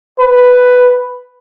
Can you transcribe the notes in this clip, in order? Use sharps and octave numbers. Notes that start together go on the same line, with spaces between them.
B4